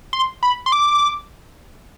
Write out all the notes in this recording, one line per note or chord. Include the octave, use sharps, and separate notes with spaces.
C6
B5
C6
D6